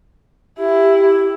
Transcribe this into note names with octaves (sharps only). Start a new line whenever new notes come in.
E4 G4